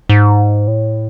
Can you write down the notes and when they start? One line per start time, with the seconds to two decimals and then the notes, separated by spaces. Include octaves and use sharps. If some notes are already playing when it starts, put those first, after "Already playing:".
0.09 G#2
0.68 A2